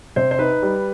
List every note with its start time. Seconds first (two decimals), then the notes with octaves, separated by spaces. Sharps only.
0.16 C3 C5
0.31 C5
0.39 D#4 B4
0.62 G3